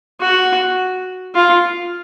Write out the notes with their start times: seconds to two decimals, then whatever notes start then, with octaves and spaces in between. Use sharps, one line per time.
0.21 F#4
1.35 F4